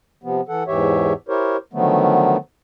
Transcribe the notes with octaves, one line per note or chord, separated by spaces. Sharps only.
C3 F3 B3
E3 A4 F#5
E2 G#2 E3 G4 C#5 E5
E4 G4 A#4 C5 C#5
D3 D#3 F3 F#3 A3 B3